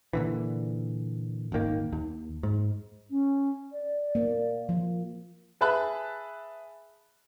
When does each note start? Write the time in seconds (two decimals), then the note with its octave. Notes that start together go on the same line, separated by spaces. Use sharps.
0.13 A#2 D3 E3
1.52 D#1 G#1 D#3 A#3
1.92 D#2
2.43 G#2
3.10 C#4
3.72 D5
4.15 A#3
4.69 F3
5.61 G#4 B4 E5 A5 B5 F#6